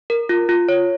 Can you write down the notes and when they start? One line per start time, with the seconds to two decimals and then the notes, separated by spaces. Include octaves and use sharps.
0.10 A#4
0.29 F4
0.49 F4
0.69 C#5